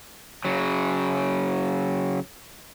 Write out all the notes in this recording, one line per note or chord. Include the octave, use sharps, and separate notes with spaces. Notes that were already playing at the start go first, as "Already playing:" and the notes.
C#3 F#3